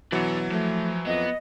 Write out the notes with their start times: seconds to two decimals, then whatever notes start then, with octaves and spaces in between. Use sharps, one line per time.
0.12 B2 E3 F#3 D4 F#5
0.51 F3 A3
1.06 F2 B3 D#5